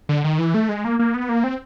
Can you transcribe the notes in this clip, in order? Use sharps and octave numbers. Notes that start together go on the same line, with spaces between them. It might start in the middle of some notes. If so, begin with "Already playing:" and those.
D3
D#3
E3
A3
G#3
A#3
A#3
B3
A#3
C4